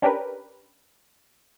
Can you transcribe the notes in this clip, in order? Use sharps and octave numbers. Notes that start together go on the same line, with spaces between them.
C#4 D4 G4 A#4 B4